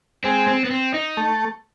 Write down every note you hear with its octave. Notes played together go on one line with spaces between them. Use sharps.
G#3 C4
C4
B3
C4
D#4
A3